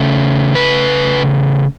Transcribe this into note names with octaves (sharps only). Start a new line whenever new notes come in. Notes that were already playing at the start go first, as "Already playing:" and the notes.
Already playing: C#3 A3 C#4
B4